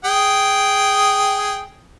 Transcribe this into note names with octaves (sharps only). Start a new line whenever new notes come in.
G#4 G5